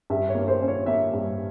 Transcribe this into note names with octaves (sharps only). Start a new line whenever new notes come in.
G2 E5
C#5
A#3
C5
C#4
C#5
A#3 E5
G2